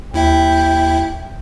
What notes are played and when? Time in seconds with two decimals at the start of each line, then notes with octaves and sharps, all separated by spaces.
0.14 D#2 E4 E5 G5